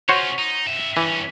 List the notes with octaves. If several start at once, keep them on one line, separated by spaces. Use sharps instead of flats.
C#4 F4 F#4 C5 C#5
D#4
G2 E5
G2 E3 C#4